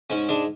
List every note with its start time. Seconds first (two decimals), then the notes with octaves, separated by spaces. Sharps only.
0.10 G#2 C#4
0.29 G#3 D4